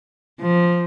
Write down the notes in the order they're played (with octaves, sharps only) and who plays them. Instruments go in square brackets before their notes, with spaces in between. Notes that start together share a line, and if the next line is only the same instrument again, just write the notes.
[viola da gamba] F3